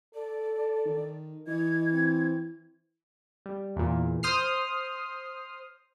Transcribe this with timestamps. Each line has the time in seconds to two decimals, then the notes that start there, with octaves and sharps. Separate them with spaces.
0.14 A4 D5
0.85 D#3
1.47 E3 D#5 G#6
1.91 C4
3.46 G3
3.76 E2 A#2
4.23 C5 D#6 F6 C7